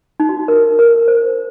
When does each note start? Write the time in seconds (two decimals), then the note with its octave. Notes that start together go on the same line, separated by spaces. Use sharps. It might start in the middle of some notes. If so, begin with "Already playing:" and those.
0.20 D#4
0.29 F#4
0.39 D#4
0.48 A#4
0.79 A#4
1.08 C5